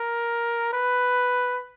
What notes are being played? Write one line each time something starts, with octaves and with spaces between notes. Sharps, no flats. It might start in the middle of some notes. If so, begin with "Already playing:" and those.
Already playing: A#4
B4